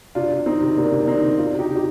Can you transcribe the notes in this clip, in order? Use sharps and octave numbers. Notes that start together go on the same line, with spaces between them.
C3 D4 F4
C3
D#3 C4 D#4
C3
C3 A#3 D4
C3
D4
D#3 C4 D#4
C3
C3 D4 F4
C3
D#4 G4
C3
G4